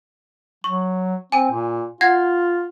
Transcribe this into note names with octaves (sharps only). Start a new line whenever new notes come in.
F#3 C#6
C4 G#5 D#7
A#2
F4 F#5 G#6 A#6